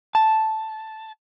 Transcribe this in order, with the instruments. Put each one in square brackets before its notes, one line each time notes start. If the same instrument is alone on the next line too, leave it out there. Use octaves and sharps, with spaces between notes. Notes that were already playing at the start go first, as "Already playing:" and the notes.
[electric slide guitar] A5